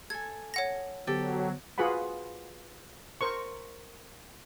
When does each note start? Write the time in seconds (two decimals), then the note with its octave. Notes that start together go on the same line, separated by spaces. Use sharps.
0.10 A4 G#5 G#6
0.54 C#5 F#5 A#6
1.07 D3 F#3 B3 G4 A4 C5
1.78 F4 F#4 G#4 B4 F#5 B5
3.21 A#4 C5 C#6